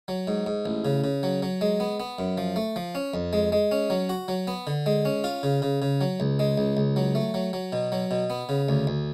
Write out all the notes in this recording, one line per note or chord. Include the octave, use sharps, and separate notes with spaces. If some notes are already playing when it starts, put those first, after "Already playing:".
F#3
G#2
G#2
A1
C#3
C#3
F#3
F#3
G#3
B3
B3
F#2
F3
A3
F3
C#4
F2
G#3
G#3
C#4
F#3
F#4
F#3
B3
D3
G#3
C#4
F4
C#3
C#3
C#3
F#3
C#2
G#3
C#2
C#2
F#3
A3
F#3
F#3
B2
F#3
B2
B3
C#3
D2
D2